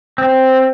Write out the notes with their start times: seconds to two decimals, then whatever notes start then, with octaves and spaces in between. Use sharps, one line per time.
0.18 C4